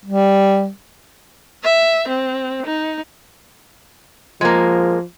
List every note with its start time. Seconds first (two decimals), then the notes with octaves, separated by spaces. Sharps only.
0.06 G3
1.64 E5
2.08 C4
2.66 D#4
4.41 F3 G#3 A#3